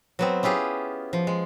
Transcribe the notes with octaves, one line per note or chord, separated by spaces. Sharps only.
F#3 B3 C4
C#4 E4 F4 G4 G#4
F3
G#3